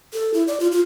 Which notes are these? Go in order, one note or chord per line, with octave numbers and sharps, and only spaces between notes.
A4
E4
D5
F4
F4